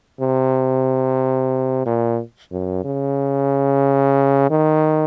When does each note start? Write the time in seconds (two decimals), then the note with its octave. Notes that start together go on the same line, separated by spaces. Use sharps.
0.20 C3
1.86 A#2
2.52 F#2
2.85 C#3
4.50 D#3